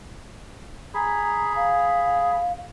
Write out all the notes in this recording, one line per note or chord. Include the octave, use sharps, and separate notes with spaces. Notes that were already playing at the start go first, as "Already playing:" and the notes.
G#4 A#5 B5
F5